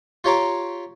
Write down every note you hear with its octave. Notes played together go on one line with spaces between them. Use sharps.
F4 G4 C#5 A#5 C6 D6